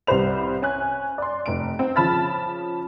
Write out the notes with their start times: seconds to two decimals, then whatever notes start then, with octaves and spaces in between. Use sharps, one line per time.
0.07 C2 G3 B4 C5 F7
0.62 C#4 G#5 F#6
1.18 D5 C6
1.46 F1 D7
1.79 C4
1.96 C#3 F3 A5 B5 F6 A6